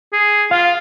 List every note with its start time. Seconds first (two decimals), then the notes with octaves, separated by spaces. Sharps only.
0.13 G#4
0.51 F4 F5